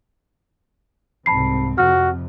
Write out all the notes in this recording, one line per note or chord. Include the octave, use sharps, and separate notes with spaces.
C2 G#2 C4 A5 B5 C7
F2 C3 F#4 F6